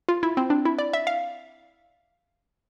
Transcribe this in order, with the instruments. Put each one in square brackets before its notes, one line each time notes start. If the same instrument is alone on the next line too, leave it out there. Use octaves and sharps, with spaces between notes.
[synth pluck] F4
E4
C4
D4
E4
D5
E5
F5